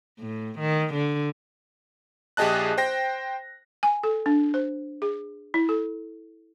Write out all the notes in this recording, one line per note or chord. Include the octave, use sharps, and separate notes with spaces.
A2
D#3
D3
A#1 G4 G#4 D#5 A5 F#6
C5 G5 A#6
G#5
A4
D4
C5
G#4
E4
A4